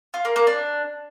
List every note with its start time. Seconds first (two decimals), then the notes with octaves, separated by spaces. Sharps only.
0.14 F4
0.25 A#3
0.36 A#3
0.47 D4